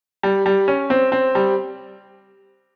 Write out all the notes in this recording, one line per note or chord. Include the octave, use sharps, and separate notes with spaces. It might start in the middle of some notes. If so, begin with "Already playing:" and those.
G3
G3
C#4
C4
C4
G3